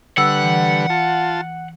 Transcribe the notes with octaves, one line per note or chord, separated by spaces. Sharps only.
D3 G3 B4 F#5 E6
E3
F4 A5